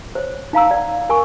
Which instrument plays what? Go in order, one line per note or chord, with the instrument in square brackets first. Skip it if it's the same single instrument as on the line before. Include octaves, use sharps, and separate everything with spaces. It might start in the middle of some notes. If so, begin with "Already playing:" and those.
[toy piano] C5 C#5
D#4 F5 A#5 E6
D5 F#5
A#4 G#5 C#6